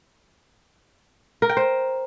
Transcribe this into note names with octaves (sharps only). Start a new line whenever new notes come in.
A#4
G5
C5